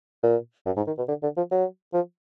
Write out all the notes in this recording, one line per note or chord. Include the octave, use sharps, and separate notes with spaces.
A#2
F#2
G#2
D#3
B2
D3
D3
F3
F#3
F3